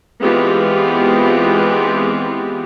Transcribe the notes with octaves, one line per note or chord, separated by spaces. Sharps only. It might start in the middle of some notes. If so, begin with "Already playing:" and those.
E3 G#3 B3 C4 F4 G4